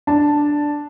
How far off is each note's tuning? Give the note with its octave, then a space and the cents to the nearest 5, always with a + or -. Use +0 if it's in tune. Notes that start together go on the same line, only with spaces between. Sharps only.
D4 +0 A5 +0